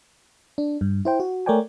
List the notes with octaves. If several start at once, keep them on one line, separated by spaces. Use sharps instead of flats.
D4
G2
E4 C5 G5
F#4
A3 A#4 C#5 D5 G5 G#5